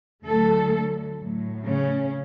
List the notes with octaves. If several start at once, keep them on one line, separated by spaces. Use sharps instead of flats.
D2 D3 F#3 A3 A4
A2 F#3
C#3 C#4